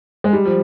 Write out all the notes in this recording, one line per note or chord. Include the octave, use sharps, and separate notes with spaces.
G#3
G3
F3